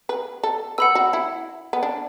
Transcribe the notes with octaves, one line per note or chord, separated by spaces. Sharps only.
B4
A4
B4 F#5 B5 E6
F#4
E4
B3
D4